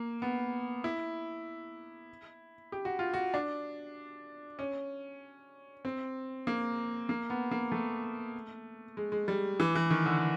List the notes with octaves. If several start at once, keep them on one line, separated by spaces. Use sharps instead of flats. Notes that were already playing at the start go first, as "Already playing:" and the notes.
Already playing: A#3
B3
E4
G4
F#4
F4
F#4
D4
C#4
C4
A#3
A#3
B3
A#3
A3
G#3
G#3
G3
E3
E3
D#3
D3